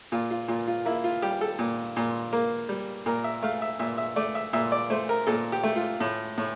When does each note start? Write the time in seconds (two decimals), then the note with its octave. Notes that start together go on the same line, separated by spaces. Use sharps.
0.12 A#2 F4
0.31 F4
0.48 A#2 F4
0.67 F4
0.85 A#3 E4
1.04 F4
1.22 G3 G4
1.41 A4
1.59 A#2
1.97 A#2
2.33 A#3
2.69 G3
3.06 A#2 A#4
3.24 E5
3.43 A3 F5
3.62 E5
3.79 A#2 E5
3.98 E5
4.16 A3 D5
4.35 E5
4.53 A#2 E5
4.72 D5
4.90 A3 C5
5.09 A#4
5.27 A#2 A4
5.52 G4
5.63 A3
5.76 F4
6.00 A2
6.38 A2